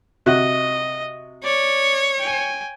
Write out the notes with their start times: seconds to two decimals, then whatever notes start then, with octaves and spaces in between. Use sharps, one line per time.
0.26 C3 F#4 D#5 F#6
1.44 C#5 D5
2.18 G5 G#5